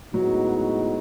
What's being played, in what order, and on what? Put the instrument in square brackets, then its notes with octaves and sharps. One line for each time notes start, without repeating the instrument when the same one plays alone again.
[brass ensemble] A2 G#3 B3 D#4 F#4 [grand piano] F#3